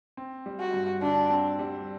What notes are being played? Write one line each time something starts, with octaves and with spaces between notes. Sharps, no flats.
C4
G3
F#4
G2
D3 D4
C4
G3